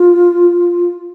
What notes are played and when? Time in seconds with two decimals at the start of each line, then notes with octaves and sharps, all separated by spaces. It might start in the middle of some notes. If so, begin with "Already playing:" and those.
Already playing: F4